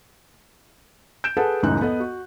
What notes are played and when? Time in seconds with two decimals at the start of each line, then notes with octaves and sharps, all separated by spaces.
1.24 G6 D7 E7
1.37 G#4 A4 B4 F#5 A5
1.63 C#2 F#2 A2 E3 D#4 F#6
1.81 B3 A4 D#5
2.00 F#4